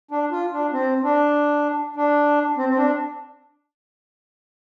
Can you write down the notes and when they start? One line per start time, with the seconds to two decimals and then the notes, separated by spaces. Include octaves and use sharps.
0.11 D4
0.32 F4
0.52 D4
0.72 C4
1.03 D4
1.96 D4
2.57 C4
2.69 C4
2.77 D4